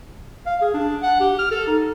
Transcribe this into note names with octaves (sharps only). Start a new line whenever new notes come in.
F5
G#4
D4
F#5
G4
F6
A4
D#4